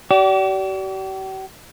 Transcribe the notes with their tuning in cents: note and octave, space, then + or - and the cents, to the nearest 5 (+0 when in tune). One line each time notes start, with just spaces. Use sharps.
G4 -45 D5 -25